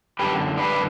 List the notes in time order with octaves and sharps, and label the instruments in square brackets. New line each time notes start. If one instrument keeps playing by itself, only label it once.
[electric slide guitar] F#2 D3 G4 B4
B4 D5